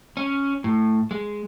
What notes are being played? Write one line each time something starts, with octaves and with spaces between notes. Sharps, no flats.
C#4
A2
G#3